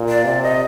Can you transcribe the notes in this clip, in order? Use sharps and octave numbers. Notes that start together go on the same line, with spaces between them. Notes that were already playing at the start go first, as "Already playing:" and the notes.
Already playing: A#2
D5
C3 D5
D#5